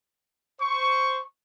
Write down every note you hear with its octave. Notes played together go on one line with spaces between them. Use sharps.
C5 C#6